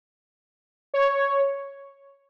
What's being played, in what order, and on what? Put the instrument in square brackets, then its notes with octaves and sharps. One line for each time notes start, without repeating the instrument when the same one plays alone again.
[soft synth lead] C#5